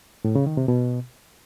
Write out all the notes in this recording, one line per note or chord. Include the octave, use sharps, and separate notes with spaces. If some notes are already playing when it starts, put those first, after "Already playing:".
A2
C#3
D#3
C3
B2